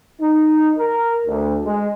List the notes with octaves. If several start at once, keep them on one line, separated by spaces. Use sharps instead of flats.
D#4
A#4
D2
G#3